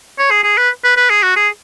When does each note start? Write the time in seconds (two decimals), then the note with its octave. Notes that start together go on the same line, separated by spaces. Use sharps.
0.19 C#5
0.31 G#4
0.44 G#4
0.57 B4
0.84 B4
0.97 B4
1.10 G#4
1.23 F#4
1.36 G#4